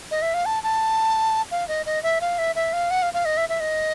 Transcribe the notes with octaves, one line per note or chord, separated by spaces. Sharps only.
D#5
E5
F5
A5
A5
F5
D#5
D#5
E5
F5
E5
E5
F5
F#5
F5
F5
D#5
E5
E5
D#5